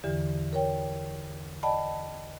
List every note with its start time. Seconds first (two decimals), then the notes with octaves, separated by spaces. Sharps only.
0.04 E2 D3 E3 G4
0.53 A#4 C#5 G5
1.63 D5 D#5 G5 A5 B5